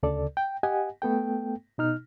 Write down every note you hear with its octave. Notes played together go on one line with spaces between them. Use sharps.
D2 C#3 A4 D5
G5
G4 D#5 F#5 G#5
A3 B3 A4 G5
B2 D#4 F6